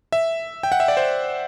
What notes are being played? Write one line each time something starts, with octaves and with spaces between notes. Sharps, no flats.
E5
G5
F#5
E5
D5
C5